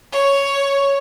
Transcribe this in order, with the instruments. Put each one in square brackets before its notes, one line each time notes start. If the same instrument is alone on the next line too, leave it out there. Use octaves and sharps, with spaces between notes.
[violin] C#5